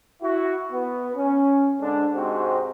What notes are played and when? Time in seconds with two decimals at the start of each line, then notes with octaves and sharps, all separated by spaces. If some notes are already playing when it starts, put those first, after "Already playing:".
0.21 E4 F#4
0.72 B3
1.15 C#4
1.80 G#2 D3 D4
2.14 G#2 C3 G#3 C4 D#4 F#4